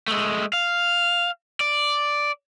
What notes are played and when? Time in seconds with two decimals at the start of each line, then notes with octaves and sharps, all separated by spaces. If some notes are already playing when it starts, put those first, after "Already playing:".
0.08 G#3 A3
0.53 F5
1.61 D5